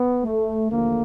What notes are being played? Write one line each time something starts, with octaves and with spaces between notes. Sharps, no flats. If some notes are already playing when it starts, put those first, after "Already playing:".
Already playing: B3
A3
D#2 D3 F3 A3 A#3